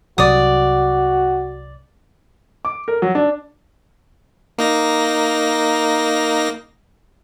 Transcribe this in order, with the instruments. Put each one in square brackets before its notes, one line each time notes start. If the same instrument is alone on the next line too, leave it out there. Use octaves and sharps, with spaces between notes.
[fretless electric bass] C2 C3 F#3 [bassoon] F#4 [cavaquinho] D5 D#6
[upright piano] D6
A#4
F#3
D4
[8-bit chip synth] A#3 D#4 A#6